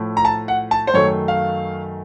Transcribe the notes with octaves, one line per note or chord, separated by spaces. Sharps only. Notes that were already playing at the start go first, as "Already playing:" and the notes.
Already playing: A2 F3 A3
A#5
A5
F#5
A5
C5
F#2 D#3 A3 C#5
F5